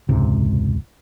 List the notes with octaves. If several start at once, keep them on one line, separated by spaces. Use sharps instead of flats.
E1 C#2 G#2 C3